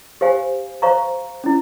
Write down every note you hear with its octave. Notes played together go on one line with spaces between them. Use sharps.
G4 C5 F5 G#5
C5 F5 A#5 C#6
C#4 E4